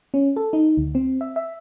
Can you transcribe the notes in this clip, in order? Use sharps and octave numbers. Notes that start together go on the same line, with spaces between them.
C#4
A4
D#4
D2
C4
E5
E5